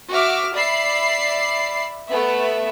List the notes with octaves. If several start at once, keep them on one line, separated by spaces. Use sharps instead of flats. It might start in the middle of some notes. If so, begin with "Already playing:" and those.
F#4 E5 D6 F6
D5 E5 B5 C7
A3 B3 E5